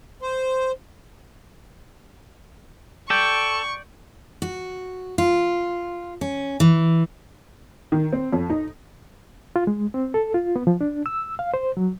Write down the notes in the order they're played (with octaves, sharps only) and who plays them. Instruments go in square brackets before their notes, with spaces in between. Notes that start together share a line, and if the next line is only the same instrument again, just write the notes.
[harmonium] C5
[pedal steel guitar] A4 [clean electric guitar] D5 G5 [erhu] C#6
[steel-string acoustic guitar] F#4
F4
C#4
E3
[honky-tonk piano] D#3
C4
F2
D#4
[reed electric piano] F4
G#3
C4
A4
F4
B3
F3
D4
E6
F5
C5
F#3